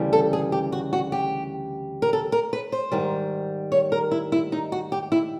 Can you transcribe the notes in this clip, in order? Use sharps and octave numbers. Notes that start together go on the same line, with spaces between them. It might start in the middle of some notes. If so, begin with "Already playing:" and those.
Already playing: D2 C#3 E3 G3
A4
G#4
G4
F#4
F#4
G4
A#4
A4
A#4
B4
C5
G#2 D#3 G3
C#5
A#4
E4
E4
D#4
F#4
G4
E4